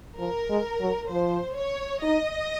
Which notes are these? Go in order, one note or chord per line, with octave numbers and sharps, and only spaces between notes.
F3 A#4
G#3
F#3
F3 C5
C#5
D#4 D#5